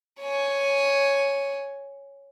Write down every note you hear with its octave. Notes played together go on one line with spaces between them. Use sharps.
C#5 G#5